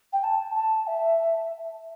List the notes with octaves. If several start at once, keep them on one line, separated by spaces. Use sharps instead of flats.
G5
A5
A5
E5